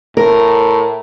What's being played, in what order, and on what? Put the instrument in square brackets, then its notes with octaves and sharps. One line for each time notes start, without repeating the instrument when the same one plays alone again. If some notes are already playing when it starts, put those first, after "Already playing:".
[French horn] A2 [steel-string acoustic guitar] A#4